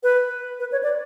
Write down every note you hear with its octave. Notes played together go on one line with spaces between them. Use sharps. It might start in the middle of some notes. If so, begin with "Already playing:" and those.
B4
B4
C#5
D5